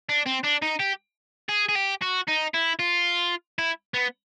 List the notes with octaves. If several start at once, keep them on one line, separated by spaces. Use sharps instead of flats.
D4
C4
D4
D#4
G4
G#4
G#4
G4
F#4
D#4
E4
F4
E4
B3